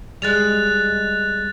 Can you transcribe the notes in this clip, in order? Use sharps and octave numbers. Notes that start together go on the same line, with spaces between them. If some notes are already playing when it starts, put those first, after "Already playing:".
G3 G#3 F#6 A6 F7